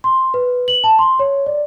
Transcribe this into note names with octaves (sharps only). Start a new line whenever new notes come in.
C6
B4
F#7
A5
C6
C#5
D5